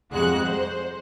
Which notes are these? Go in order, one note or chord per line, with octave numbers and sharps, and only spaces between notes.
F2 G3 G#3 F#4 F#6
C5